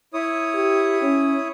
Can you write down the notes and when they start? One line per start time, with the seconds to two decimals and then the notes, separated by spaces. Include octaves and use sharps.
0.13 E4 C#5 D#6
0.54 G4
1.02 C#4